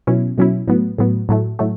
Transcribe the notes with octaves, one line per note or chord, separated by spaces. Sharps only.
B2 F#3 C#4 E4
B2 F#3 C#4 E4
A2 F#3 B3
A2 F#3 B3
A2 F#3 A3
A2 F#3 A3